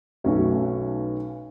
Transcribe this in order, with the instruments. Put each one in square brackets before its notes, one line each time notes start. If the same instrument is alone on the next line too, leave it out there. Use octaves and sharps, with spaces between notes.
[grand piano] B1 B2 A3 C#4 F#4